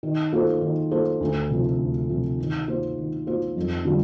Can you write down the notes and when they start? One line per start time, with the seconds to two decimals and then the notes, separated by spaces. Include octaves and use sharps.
0.03 D#3
0.33 A#3 F4 A4 C5
0.61 D#3
0.91 A#3 F4 A4 C5
1.21 D2
1.51 C3 F3
1.79 D2
2.09 C3 F3
2.39 D#3
2.68 A#3 F4 C5
2.98 D#3
3.27 A#3 F4 C5
3.57 F2
3.85 D3 G3 D4 F4